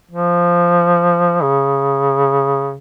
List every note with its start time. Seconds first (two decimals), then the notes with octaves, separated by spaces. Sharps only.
0.11 F3
1.42 C#3